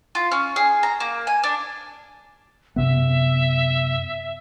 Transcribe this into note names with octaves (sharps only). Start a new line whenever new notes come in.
F4
C#4
G#4
A#5
A#3
G#5
D4
F#2 C3 B3 E5